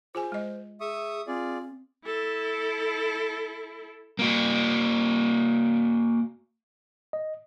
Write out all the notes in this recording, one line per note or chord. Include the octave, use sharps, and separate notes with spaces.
F4 G#4 C5 G#5
G#3 D#5
G#4 E5 C#6 D#6
C4 F4 G#4 D5
E4 A4
A#3 F#4
D#5